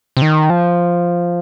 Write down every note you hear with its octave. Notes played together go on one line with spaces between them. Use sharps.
C3
D#3
F3